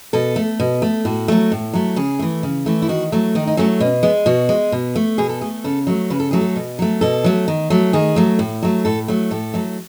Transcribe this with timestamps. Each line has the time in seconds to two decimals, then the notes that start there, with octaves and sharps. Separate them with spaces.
0.13 B2 A4
0.36 A3
0.60 B2
0.82 A3
1.05 A2 F#4
1.28 F#3 A3
1.52 A2
1.74 F#3 A3
1.96 C#3 G#4
2.19 E3 A3
2.43 C#3
2.66 E3 A3
2.82 E4
2.89 D#3 F#4
3.12 F#3 A3
3.35 D#3 D#4
3.47 D#4
3.57 F#3 A3 C#4
3.80 B2 C#4
4.03 G#3 B3
4.26 B2 F#4
4.49 G#3
4.72 B2
4.95 A3
5.18 B2 G#4
5.29 A4
5.41 A3 G#4
5.64 C#3 A4
5.87 F#3 A3
6.10 C#3 B4
6.20 A4
6.31 F#3 A3 G#4
6.41 A4
6.56 B2
6.79 F#3 A3
7.01 B2 A4
7.24 F#3 A3
7.48 D#3
7.70 F#3 A3
7.93 D#3 G#4
8.16 F#3 A3
8.39 A2
8.63 F#3 A3
8.85 A2 A4
9.08 F#3 A3
9.31 A2 A4
9.54 F#3 A3